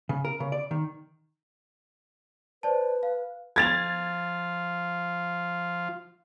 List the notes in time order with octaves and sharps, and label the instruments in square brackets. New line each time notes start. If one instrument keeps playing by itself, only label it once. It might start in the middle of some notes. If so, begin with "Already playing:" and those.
[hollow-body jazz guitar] C#3
A#4
C#3
D5
D#3
[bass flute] B4 [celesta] C5 D5 A5
[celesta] F5
[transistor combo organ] F3 F4 [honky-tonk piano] G#6 A6 F7